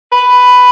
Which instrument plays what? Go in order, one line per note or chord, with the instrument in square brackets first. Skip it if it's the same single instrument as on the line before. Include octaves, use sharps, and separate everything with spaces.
[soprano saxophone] B4